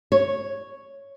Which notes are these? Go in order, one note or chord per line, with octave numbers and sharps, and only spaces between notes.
C#5